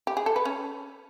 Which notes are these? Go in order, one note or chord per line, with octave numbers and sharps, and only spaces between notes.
G4
G#4
A4
B4
C#4